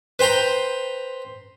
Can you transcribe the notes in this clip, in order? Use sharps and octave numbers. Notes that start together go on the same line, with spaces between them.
B4 C5 G5 A#5 C6